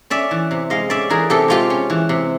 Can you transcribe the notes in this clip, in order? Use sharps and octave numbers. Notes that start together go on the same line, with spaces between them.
C#4 D5 E5
E3
C3
G#3 D#5 F5
C#4 D5 E5
E3 G#4 A#4
C3 G4 A4
G#3 F4 G4
C#4
E3
C3